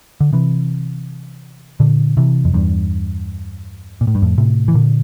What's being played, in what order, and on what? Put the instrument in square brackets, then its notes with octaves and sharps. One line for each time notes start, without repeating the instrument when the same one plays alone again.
[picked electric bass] D3
C3 E3
A#2 D3
C3 E3
F2
E2 G2
A#2
A2
G2
F2 A2
A2 C3
E3
A#2 D3